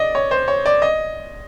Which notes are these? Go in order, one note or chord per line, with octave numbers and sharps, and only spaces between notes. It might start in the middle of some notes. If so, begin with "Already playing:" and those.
Already playing: D5 D#5
C#5
C5
C#5
D5
D#5